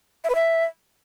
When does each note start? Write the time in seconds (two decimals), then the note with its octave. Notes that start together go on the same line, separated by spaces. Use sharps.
0.24 E5
0.30 B4
0.35 E5